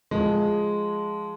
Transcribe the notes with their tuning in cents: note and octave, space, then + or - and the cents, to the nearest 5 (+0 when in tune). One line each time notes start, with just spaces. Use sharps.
F3 +0 G#3 +0